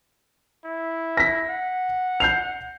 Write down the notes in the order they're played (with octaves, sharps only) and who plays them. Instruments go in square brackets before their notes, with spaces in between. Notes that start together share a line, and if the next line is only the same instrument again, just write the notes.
[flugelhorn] E4
[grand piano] A#6 B6
[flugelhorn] F#5
[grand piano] G6 C7 F7